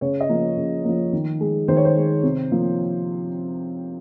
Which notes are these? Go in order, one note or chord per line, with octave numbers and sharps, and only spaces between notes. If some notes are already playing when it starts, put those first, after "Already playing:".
C#3 C#5
D#5
F3 A#3
C#3
F3 A#3
D#3
G#3
D#3 C5
C#5
C5
G#3
C3
F3 A#3